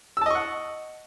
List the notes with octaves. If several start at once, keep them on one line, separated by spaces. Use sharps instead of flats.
D#5 F#5 A5 C#6 E6